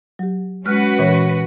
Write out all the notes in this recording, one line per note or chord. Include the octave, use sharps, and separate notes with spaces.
F#3 G4
G#3 C#4 F#4 B4 F6 F#6
A#2 E3 C#5